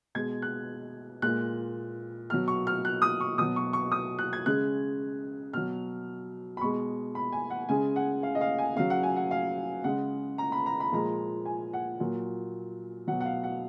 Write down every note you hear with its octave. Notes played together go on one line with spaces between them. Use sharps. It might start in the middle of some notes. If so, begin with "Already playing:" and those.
B2 G#3 G#6
F#6
A#2 G#3 F#6
B2 F#3 F6
C#6
F6
F#6
D#6
C#6
B2 F#3 D#6
C#6
C#6
D#6
F#6
G#6
C#3 G#3 F#6
B2 F#3 F6
B5
B2 G#3 C#6
B5
G#5
F#5
C#3 G#3 G#5
F#5
F5
D#5
F5
G#5
C#3 F#3 F5
F#5
G#5
F#5
F5
C#3 G#3 F#5
A#5
B5
A#5
B5
A#2 F3 G#3 A#5
G#5
F#5
A#2 F#3
B2 F#3 F#5
F#5
F5
F#5